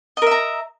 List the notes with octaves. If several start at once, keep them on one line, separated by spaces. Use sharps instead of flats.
A#4 D#5 E5 A#5